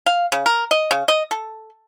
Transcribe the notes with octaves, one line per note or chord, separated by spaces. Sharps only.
F5
C#3
A#4
D#5
C#3
D#5
A4